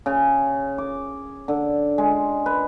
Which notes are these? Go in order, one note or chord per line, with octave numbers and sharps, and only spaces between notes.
C#3
D6
D3
G#3
B4